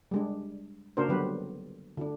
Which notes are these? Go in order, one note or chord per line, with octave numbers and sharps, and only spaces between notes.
G3 G#3 D4
C#3 A#3 D4 F#4 A#4 C5
D3 F#3 G3 B3 G4 B4
D3 D4